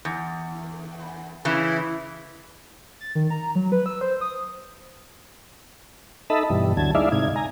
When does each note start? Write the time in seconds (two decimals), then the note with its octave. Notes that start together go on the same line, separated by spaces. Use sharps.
0.05 E2
1.45 C#3 E3 E4
3.00 A6
3.15 D#3
3.30 A#5
3.55 F#3
3.72 B4
3.86 E6
4.01 C5
4.21 D#6
6.30 D#4 A4 D#5 E5 A5 B5
6.50 G2 B2 E3 G3
6.77 D2 D3 F#3 A5 G#6
6.95 G#3 D#4 E4 D5 E5 F5
7.12 G#2 C3 D#4 G#6
7.36 G#5 A#5